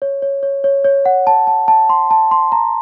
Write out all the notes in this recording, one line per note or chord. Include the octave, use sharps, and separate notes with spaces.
C#5
C#5
C#5
C#5
C#5
F#5
A5
A5
A5
C6
A5
C6
A#5